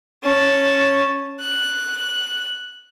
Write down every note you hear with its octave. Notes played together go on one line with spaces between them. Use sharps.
C#4 A5
F#6